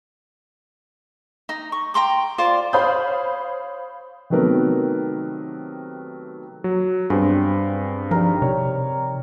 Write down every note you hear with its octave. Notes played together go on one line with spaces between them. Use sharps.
D#4 A#5
C#6
G5 A#5 C6 D6
F4 C5 D5
C5 C#5 F5 B5 D#6 G6
C3 D#3 F#3 A3 B3 A#4
F#3
G2 B3 C4 G#4
F3 G3 D#4 A#4
C3 A#4 C#5